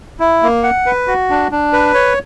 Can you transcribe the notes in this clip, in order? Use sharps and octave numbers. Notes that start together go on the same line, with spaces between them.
E4
A#3
F#5
B4
F#4
D4
D4
B4
C#5